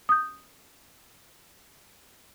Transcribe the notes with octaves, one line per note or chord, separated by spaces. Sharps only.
D#6 G6